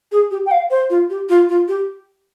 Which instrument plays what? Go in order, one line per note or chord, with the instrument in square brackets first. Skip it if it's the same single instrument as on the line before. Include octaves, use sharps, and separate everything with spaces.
[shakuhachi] G#4
G4
G5
F5
C5
F4
G4
F4
F4
G4